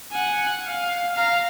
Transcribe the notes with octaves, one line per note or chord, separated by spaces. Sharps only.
F#5 G#5
F5
F5 A#5